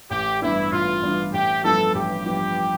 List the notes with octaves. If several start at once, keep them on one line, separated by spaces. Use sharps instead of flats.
A1 G4
G2 E3 B3 D4 E4
A1 F4
G2 E3 B3 D4
A1 G4
G2 F3 B3 F4 A4
A1 G4
G2 F3 B3 F4